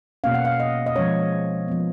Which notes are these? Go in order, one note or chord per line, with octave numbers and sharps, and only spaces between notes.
B2 A#3 C#4 F5
F#5
F5
D#5
D#5
F3 G#3 C#4 C#5
F3 B3